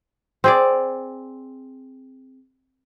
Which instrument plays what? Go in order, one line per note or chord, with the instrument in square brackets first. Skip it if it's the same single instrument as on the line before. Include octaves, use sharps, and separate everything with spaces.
[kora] C4 G#4 D5